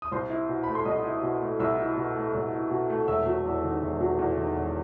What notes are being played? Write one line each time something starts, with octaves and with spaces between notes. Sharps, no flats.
D#6
C2 C5 C6
E4
B2
A3 B5
C6
C2 D#5 D#6
E4
B2
A3
C2 E5 E6
E4
B2
A3
C2
E4
B2
A3
E1 E5 E6
F#3
E2
D#3
E1
F#3
E2
D#3
E1